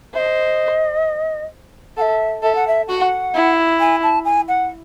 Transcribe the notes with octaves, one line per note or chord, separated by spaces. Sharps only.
C5 D#5 E5
A4 E5 F#5
A4 E5
F#5
E5
F#4 F#5
E4
G#5
A5
G#5
F#5